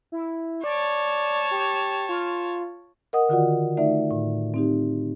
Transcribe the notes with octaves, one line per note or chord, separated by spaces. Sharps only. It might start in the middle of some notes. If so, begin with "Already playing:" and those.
E4
C#5 D5 A5
G4
F4
A#4 D#5 F#5 D#6
D3 D#3 F4 F#4 D5 F#5
A3 D#4 D5 E5
A2
C4 D#4 G4